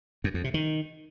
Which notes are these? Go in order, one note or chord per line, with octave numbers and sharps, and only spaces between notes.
F#2
F2
C3
D#3